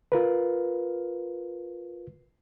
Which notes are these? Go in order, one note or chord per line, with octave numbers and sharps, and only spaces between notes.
F4 A#4 B4